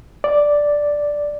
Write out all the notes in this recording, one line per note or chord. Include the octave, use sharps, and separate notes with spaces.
D5